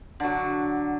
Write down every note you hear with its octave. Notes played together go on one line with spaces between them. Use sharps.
D3 F#3